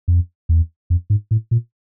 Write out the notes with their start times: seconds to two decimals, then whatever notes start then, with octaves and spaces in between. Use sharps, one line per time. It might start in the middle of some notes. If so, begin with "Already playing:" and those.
0.08 F2
0.49 E2
0.90 F2
1.10 G#2
1.31 A2
1.51 A#2